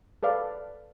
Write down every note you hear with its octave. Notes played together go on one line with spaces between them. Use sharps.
A4 B4 D5 F5